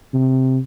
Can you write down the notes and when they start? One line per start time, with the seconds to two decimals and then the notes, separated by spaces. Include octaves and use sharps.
0.14 C3